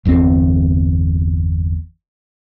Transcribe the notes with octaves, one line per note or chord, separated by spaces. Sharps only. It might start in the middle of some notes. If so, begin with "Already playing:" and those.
G1 E2 D3 C4